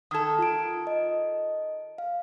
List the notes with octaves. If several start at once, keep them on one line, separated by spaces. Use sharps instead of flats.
D#3 A4 D#6 G#6
F4 D7
D#5
F5